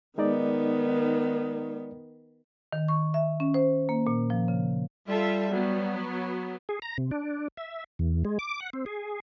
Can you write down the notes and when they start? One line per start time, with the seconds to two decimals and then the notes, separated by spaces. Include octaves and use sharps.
0.18 D#3 G#3 B3 D#4 D5
2.73 D#3
2.88 C#6
3.14 E5
3.40 C#4
3.54 C5
3.89 A#3
4.07 A#2
4.30 F3
4.48 C#3
5.08 G3 F4 A4 E5
5.52 F#3 B3
6.69 G#4
6.82 A#5
6.98 C3
7.11 D4
7.57 E5
7.99 E2
8.25 G#3
8.39 D6
8.60 F#5
8.73 C4
8.86 G#4